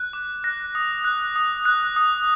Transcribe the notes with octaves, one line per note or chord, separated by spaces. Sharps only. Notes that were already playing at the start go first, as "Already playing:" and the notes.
Already playing: F#6
D6
F#6 A#6
D#6
F#6
D#6
F#6
D#6